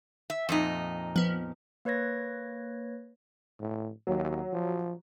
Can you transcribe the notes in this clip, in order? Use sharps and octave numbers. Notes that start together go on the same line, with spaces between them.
E5
F2 A#2 D#4
F3 B3
A#3 B4 C#5 G#6 A#6
A2
D#2 F#3
F3